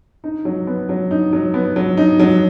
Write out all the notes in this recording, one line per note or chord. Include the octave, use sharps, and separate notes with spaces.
D#4
F#3
B3
F#3
D#4
F#3
B3
F#3
D#4
F#3